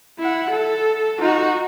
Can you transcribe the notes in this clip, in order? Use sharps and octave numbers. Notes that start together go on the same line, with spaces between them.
E4 F#5
A4
D#4 F#4